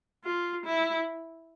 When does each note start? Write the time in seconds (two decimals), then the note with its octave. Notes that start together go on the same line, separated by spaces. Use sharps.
0.24 F4
0.65 E4